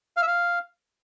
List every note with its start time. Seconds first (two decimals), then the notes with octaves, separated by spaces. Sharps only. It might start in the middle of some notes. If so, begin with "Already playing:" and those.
0.17 F5
0.22 E5
0.27 F5